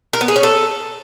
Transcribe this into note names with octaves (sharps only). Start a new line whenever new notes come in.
A#4
B3
G#4
C#4
A4